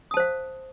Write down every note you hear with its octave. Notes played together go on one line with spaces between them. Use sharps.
C5 F5 A5 D#6